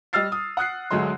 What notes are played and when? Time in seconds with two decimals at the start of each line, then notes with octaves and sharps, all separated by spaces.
0.13 G3 D#5 E6 F6 A6 C7
0.32 D#6
0.57 F#5 D#6 F#6 C7
0.91 D2 D3 F#3 G#3 D#5 C6